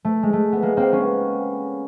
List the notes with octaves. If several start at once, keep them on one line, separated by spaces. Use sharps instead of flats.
A3
G#3
A3
B3
G#3 A#3
A#3 C4
B3 C#4